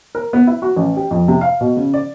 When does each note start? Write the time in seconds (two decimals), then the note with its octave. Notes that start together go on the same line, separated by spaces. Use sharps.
0.15 A#4
0.33 B3
0.47 E4
0.62 F#4
0.76 A1
0.97 G4
1.11 F2
1.28 C3
1.41 F5
1.61 B2
1.77 C#3
1.94 D5